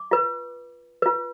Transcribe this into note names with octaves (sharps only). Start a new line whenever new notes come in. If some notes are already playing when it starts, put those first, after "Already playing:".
Already playing: D6
F4 B4
F4 B4